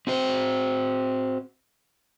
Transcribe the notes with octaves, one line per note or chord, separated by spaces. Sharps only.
C4 F#4 C5